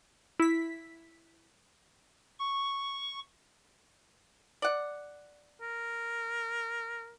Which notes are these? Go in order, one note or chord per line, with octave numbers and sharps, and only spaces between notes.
E4 B6
C#6
D5 F#5
A#4